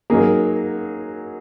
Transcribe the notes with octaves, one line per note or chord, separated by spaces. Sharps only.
F#3 A#3 D#4 G#4